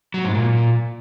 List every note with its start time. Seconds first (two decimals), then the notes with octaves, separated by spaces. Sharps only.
0.14 F#3
0.24 G#2
0.35 A#2